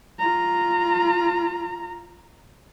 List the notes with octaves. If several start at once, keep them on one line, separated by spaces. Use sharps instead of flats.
F4 A#5